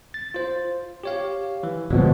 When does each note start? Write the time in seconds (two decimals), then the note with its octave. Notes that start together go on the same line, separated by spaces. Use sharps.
0.14 A6
0.34 F4 C5
1.04 G4 C#5 F5
1.63 E3
1.90 D1 B2 F3 F#3 G#3